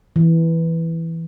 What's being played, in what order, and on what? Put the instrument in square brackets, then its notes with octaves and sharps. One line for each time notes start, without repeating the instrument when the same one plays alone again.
[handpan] E3